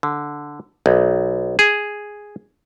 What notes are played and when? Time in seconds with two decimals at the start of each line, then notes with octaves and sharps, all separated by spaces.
0.03 D3
0.86 B1
1.59 G#4